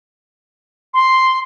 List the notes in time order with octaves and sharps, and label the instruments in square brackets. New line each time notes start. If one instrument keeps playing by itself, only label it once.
[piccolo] C6